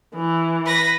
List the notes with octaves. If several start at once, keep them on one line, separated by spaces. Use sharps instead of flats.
E3
B4 A#6